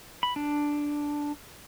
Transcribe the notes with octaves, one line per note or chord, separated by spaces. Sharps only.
B5
D4